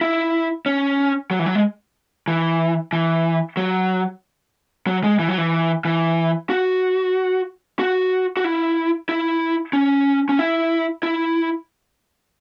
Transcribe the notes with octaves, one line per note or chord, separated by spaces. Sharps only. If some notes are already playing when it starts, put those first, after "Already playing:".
E4
C#4
F#3
E3
F#3
G#3
E3
E3
F#3
F#3
G#3
E3
F#3
E3
E3
F#4
F#4
F#4
E4
E4
C#4
C#4
E4
E4